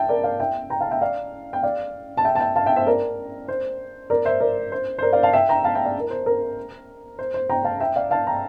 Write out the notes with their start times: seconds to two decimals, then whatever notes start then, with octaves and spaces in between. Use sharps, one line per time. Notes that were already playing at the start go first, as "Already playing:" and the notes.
Already playing: E5 G5 A5
0.09 A#4 D5
0.24 D5 F5
0.40 E5 G5
0.70 G5 A#5
0.81 F5 A5
0.91 E5 G5
1.01 D5 F5
1.53 G5
1.63 D5 F5
2.17 A5
2.24 E5 G5
2.35 A5
2.40 E5 G5
2.56 F5 A5
2.66 E5 G5
2.76 C5 E5
2.87 A#4 D5
3.48 C5
4.10 A#4 D5
4.25 C5 E5
4.40 A#4 D5
4.72 C5
4.98 C5
5.02 A#4 D5
5.13 D5 F5
5.23 F5 A5
5.33 E5 G5
5.49 G5 A#5
5.64 F5 A5
5.74 E5 G5
5.85 D5 F5
6.00 A#4
6.11 C5
6.26 A#4
7.19 C5
7.34 C5
7.49 G5 A#5
7.65 F5 A5
7.80 E5 G5
7.96 D5 F5
8.11 F5 A5
8.27 G5 A#5